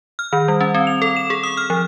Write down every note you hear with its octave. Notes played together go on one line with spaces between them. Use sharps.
F6
D#3
G3
C#4
C4
F7
A4
E7
G#4
D#6
F6
F3